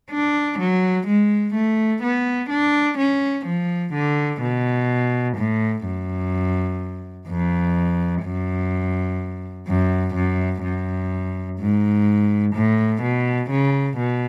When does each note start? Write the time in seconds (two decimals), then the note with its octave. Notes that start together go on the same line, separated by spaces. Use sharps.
0.11 D4
0.59 F#3
1.07 G#3
1.54 A3
2.03 B3
2.49 D4
2.98 C#4
3.46 F3
3.93 D3
4.41 B2
5.37 A2
5.85 F#2
7.28 F2
8.24 F#2
9.68 F#2
10.15 F#2
10.63 F#2
11.59 G#2
12.54 A2
13.02 B2
13.50 C#3
13.97 B2